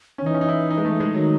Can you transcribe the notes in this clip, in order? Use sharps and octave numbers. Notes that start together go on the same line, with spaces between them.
C#4
D#3
E3 D#4
C#4
D#4
E4
D#4
G#3
A3
G#3
E3
D#3 F#3